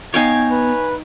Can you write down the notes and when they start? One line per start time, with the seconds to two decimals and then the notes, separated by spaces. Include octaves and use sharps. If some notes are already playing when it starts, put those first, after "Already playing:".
0.14 B3 D#4 C#5 F5 G5 G#5
0.51 B4